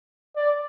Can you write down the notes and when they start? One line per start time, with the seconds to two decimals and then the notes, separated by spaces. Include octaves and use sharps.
0.36 D5